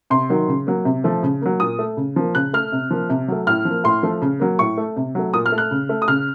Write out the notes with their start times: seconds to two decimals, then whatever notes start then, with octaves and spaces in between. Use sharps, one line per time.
0.10 C3 C6
0.30 D#3 F#3
0.48 C#3
0.67 F#3 A#3
0.85 C3
1.04 F3 A3
1.23 C#3
1.42 F#3 A#3
1.60 A#2 D#6
1.79 A3
1.97 C#3
2.16 F3 A#3
2.35 C#3 F#6
2.53 A3 F6
2.72 C3
2.91 F3 A#3
3.09 C3
3.28 F#3 A3
3.47 A2 F6
3.65 F3
3.70 A#3
3.84 A2 C6
4.03 F3 A3
4.22 C#3
4.40 F#3 A#3
4.59 A2 C#6
4.77 A3
4.96 C3
5.15 F#3 A3
5.34 A#2 D#6
5.46 F6
5.52 A3
5.58 F#6
5.71 C#3
5.89 A3
6.02 D#6
6.08 C#3 F6